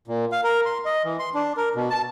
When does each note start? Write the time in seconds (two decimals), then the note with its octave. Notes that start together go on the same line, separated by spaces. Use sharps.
0.08 A#2
0.32 F5
0.44 A#4
0.66 C6
0.85 D#5
1.05 E3
1.19 C6
1.34 D4
1.57 A#4
1.75 B2
1.90 A5